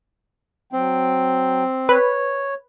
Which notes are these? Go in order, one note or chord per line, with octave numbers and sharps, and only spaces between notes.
F#3 C4 G5
B4 C#5